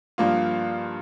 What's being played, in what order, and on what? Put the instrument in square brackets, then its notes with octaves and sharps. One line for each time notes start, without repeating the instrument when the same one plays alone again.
[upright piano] G2 F3 A#3 F4